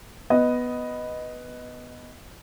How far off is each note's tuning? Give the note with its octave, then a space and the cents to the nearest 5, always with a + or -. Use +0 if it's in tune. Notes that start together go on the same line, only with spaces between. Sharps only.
B3 +0 D#5 +0